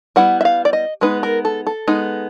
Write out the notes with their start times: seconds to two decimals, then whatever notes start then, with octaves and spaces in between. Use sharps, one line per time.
0.16 G3 B3 E4 F#5
0.41 E5
0.45 F5
0.65 D5
0.73 D#5
1.01 G#3 B3 D#4 B4
1.23 A#4
1.45 A4
1.67 A4
1.88 G#3 B3 D#4